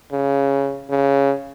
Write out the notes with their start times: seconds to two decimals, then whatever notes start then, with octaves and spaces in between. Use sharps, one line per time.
0.12 C#3
0.90 C#3